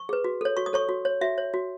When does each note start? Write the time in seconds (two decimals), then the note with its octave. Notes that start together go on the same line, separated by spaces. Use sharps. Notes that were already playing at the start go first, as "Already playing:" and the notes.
Already playing: C#6
0.09 G#4 B4
0.24 F#4
0.41 A4 C#5
0.57 F#4 C#6
0.66 D#6
0.73 A4 C#5 C#6
0.89 F#4
1.05 C#5
1.21 F#4 E5
1.38 C#5
1.54 F#4